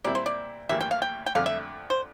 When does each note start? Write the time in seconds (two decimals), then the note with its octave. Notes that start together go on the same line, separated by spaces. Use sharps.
0.04 A#2 G3 C4 E4 D5
0.15 C5
0.26 D5
0.69 A1 G2 E3 G3 A#3 E5
0.81 G5
0.91 F5
1.02 G5
1.26 G5
1.35 F2 D3 A3 D4 F5
1.46 E5
1.90 C5